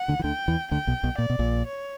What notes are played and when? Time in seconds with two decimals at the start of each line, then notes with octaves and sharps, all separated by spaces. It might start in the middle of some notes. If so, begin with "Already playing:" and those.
Already playing: F#5
0.08 D2 D3
0.19 E3
0.24 D2 D3 G5
0.48 E2 E3
0.71 D2 D3 G5
0.87 B1 B2
1.03 B1 B2
1.18 A#2 D5
1.30 B2
1.39 A#1 A#2
1.67 C#5